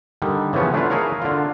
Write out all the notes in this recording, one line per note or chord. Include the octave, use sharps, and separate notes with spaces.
D3 D#3 G3
C#3 E3 F3 B3 C#4
A3 D4 E4 F4 B4
E4 G#4 A#4 C#5 F5
D3 F4